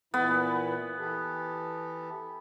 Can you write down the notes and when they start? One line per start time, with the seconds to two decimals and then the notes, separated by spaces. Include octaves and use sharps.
0.14 A#2 E3 B3 E4
0.98 E3 G4 A4